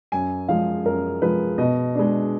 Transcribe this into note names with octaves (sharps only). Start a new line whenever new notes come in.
F#2 G#5
F3 G#3 F5
F#2 A#4
F3 G#3 B4
B2 D#5
G#3 D4